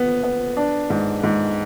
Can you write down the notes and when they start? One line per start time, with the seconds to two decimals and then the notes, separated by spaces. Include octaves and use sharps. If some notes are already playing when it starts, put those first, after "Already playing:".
Already playing: B3
0.23 B3
0.57 D4
0.90 G#2
1.23 G#2